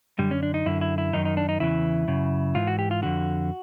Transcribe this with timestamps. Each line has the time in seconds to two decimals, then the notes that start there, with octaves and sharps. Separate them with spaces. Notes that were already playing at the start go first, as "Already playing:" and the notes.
0.19 F#2 D3 G3
0.31 C#4
0.43 D4
0.54 D#4
0.66 F#2 D3 E4
0.81 E4
0.98 E4
1.13 F#2 D#3 D#4
1.25 D#4
1.37 D4
1.49 D#4
1.60 E2 C#3 E3 E4
2.08 F#2 C#3
2.55 G#2 E3 F4
2.67 F#4
2.79 G4
2.91 F4
3.02 F2 D3 F#4